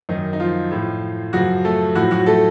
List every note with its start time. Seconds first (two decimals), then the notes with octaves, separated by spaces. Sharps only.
0.09 F#2 D#3 D#4
0.33 D#4
0.40 F3 F4
0.72 A2 F3
1.33 F#2 C#3 F3 F#3 F#4
1.64 A3 A4
1.95 A2 F3 F#3 F#4
2.11 F#3 F#4
2.26 A3 A4